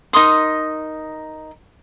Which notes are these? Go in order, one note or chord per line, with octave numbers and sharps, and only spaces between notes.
D#4 A#4 C6 D#6